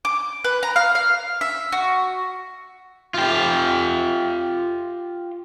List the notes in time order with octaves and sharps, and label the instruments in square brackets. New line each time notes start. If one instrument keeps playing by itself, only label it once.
[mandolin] D6
B4
A#5
F5
F5
E5
F#4
[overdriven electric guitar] F4 G4